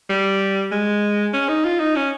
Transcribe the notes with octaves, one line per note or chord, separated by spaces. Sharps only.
G3
G#3
C#4
D#4
F4
D#4
C#4